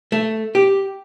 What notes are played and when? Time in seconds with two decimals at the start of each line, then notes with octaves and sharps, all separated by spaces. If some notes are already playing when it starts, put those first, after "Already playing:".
0.12 A3
0.55 G4